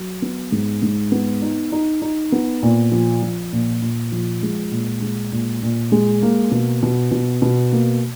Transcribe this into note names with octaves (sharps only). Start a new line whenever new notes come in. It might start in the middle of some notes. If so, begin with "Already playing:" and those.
Already playing: F#3
B3
G#2
G#2
B3
D#4
D#4
D#4
B3
A#2
F3
F3
A#2
A#2
F3
G#3
A#2
G#3
A#2
A#2
G#3
A#3
B2
B2
B2
B2
A#3